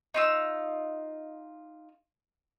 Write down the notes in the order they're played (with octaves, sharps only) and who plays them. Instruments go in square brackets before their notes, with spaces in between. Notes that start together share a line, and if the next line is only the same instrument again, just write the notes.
[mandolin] D#4 F4 E6